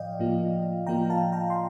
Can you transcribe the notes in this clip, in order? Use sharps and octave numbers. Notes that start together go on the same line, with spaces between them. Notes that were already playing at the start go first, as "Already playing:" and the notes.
Already playing: A2 F3 D5 D#5 F5 G5
A2 F3 A#3 F4
A2 F3 A#3 F4 G5 A#5
F5 A5
G5 A#5
C6